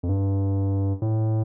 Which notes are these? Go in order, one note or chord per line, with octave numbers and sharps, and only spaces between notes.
F2
G2
A2